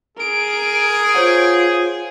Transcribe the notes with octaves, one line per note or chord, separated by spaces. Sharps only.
G#4 A#4 D7
F4 C5 C#5 F#5